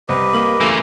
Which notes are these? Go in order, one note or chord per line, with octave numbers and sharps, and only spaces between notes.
C2 C4 G4 B4 D#5
A#3
C#3 E3 A3 A#3 C6